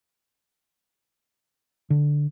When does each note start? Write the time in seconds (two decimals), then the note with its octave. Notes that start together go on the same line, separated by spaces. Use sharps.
1.90 D3